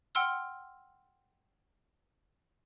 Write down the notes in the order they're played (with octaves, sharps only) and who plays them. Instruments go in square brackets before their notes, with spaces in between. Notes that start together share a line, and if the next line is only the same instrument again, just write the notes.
[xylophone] F#5 G5 C6 E6 F6